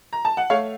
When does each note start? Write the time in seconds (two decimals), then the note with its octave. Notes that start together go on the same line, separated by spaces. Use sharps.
0.13 A#5
0.25 A5
0.37 F#5
0.50 A3 C#5 F5